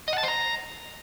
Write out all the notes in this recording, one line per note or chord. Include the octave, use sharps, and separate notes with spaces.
D#5
F#5
A5
C5
A#5